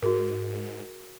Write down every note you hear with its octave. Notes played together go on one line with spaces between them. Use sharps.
G#2 F#4 G#4 A#4